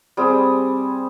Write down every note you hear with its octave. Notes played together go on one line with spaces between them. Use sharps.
G3 C4 G#4